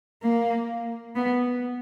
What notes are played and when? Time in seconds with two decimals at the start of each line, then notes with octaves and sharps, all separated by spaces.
0.23 A#3
1.15 B3